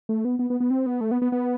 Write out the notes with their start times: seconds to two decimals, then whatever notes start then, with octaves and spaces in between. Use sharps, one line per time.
0.09 A3
0.25 B3
0.39 B3
0.50 B3
0.60 B3
0.71 C4
0.86 B3
1.01 A3
1.11 B3
1.22 B3
1.32 B3